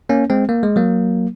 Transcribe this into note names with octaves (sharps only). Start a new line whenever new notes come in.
A#3 C#4
G#3 C4
A#3
G#3
F#3 A#3